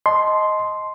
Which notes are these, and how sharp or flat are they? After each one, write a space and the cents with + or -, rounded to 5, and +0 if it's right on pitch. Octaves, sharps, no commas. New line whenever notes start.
D#5 +5 A5 -30 C6 +0